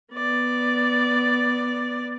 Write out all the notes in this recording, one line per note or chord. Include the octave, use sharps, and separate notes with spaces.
B3 D5